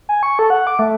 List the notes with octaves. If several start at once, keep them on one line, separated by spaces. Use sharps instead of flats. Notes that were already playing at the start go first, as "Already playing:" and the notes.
G#5
C#6
A4
F#5
D6
A3